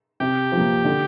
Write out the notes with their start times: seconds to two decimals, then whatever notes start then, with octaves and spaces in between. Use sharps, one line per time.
0.20 C3 G4
0.52 F3
0.57 A#3
0.85 D3